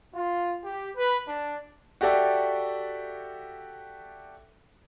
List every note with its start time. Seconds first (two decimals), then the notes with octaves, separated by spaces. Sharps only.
0.15 F4
0.64 G4
0.97 B4
1.28 D4
2.01 F#4 G4 A4 D5 E5 G5